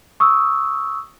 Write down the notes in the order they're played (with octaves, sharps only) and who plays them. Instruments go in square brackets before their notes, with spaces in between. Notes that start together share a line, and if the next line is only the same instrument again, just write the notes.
[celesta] C#6 D#6 E6